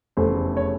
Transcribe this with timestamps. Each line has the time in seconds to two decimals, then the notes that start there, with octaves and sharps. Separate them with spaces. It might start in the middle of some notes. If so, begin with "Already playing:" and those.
0.17 F1 E2 C#3 E3 A3 C5
0.57 C#5